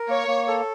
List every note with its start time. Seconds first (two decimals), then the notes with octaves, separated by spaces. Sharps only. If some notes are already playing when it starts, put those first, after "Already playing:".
Already playing: A#4
0.08 A#3 C#5
0.28 A#3
0.47 A4